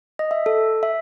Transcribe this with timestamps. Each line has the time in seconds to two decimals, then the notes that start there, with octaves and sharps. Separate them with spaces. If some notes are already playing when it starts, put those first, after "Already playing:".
0.19 D#5
0.31 E5
0.46 A4
0.83 E5